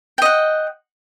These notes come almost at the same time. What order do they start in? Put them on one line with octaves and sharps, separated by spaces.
G5 D#5 F#5